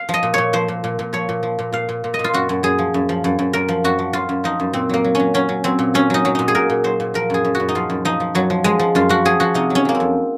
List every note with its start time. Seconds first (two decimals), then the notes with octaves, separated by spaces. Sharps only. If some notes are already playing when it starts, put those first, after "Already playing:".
Already playing: F5
0.09 F3
0.14 D#5
0.23 A#2
0.34 A#2 C#5
0.53 F3 C5
0.68 A#2
0.84 A#2
0.99 A#2
1.13 F3 C#5
1.29 A#2
1.43 F3
1.59 A#2
1.73 A#2 F5
1.89 A#2
2.04 A#2
2.14 D#5
2.19 A#2
2.24 F4
2.34 F#2 F#4
2.49 F#2
2.63 F#2 G#4
2.79 F3
2.94 F#2
3.09 F3
3.24 F#2
3.39 F#2
3.53 F#2 A#4
3.68 F3
3.84 F#2 F#4
3.99 F3
4.13 F#2 F4
4.29 F#2
4.44 F3 D#4
4.60 F#2
4.73 A#2 C4
4.89 F#3 A#3
5.04 F#3
5.15 F#3 C#4
5.34 F#3 C#4
5.49 F#3
5.64 F#3 C4
5.79 A#2
5.94 F#3 C#4
6.10 F#3 D#4
6.25 F#3
6.35 A#2 D#4
6.48 G#4
6.55 A#2 A#4
6.70 A#2
6.84 F#3 C5
7.00 A#2
7.14 F3 A#4
7.30 F#2 G#4
7.44 F#2
7.55 F#4
7.60 F#2
7.69 D#4
7.75 F3 F4
7.90 F#2
8.05 F3 D#4
8.20 F3
8.35 F#2 F#3
8.50 F3
8.64 F3 G#3
8.79 F3
8.95 F#2 F4
9.09 F3 F#4
9.25 F3 G#4
9.40 F3 F#4
9.54 C3 D#4
9.70 F#3
9.75 C#4
9.85 F#3 A#3
9.95 C4
10.00 F2